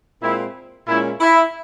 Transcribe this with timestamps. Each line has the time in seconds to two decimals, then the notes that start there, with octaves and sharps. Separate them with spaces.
0.22 A#2 G#3 C4 E4
0.88 A#2 G#3 C#4 E4
1.21 E4